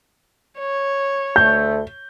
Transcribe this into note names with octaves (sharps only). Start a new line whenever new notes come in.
C#5
D2 A3 G6